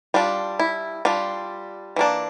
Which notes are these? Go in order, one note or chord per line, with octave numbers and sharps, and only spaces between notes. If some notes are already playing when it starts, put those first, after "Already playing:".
G3 D4 F4
E4
G3 D4 F4
E3 A#3 D4